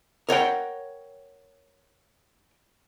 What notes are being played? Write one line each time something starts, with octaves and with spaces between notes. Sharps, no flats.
A#4 C#5 F#5 G5